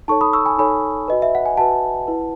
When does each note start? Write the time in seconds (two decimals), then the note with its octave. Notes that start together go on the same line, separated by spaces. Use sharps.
0.08 D#4 A4 C#5 A5 C#6
0.21 B5 D#6
0.33 C#6 E6
0.46 G#5 B5
0.58 D#4 A4 C#5 G#5 B5
1.08 F#4 B4 D#5
1.22 E5
1.35 F#5
1.46 G#5
1.57 F#4 B4 F#5 A5
2.07 E4 B4